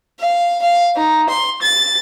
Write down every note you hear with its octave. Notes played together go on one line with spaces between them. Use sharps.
F5
F5
D#4
C6
A6